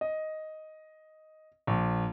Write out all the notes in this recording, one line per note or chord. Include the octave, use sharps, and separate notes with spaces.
D#5
A#1